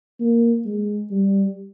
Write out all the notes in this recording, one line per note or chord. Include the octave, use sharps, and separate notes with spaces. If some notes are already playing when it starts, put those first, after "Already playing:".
A#3
G#3
G3